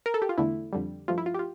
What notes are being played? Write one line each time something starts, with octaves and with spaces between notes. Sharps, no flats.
A#4
A4
G4
F4
E2 D3 A3 E4
F2 D3 G3
G2 F3 A3 F4
E4
F4
G4
F4